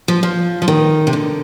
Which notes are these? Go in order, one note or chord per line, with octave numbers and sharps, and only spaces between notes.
F3
F3
F3
D#3
C3
D3